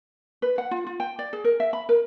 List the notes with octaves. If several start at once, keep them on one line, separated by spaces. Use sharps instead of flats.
B4
F#5
F4
F4
G5
D5
G#4
A#4
E5
B5
A#4